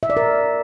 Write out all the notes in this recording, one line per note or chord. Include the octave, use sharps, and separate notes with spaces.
E5
D5
A#4